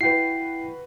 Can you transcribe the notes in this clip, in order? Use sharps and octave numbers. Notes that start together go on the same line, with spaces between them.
E4 F#4 B4 G5 C7